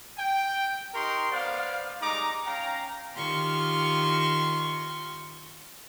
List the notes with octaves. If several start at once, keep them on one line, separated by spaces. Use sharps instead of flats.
G5
D#4 G4 A#4 C6 C#6
B3 C5 D5 F5
G3 G#3 D#4 A#5 D6
C#4 F5 G5 A#5
D#3 F4 G4 C6 C#6 F6